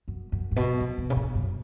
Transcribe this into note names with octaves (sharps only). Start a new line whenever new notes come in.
F#2
F#2
G#2
B2
F#2
B2
C#3
B2
F#2